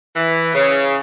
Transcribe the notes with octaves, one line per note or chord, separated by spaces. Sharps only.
E3
C#3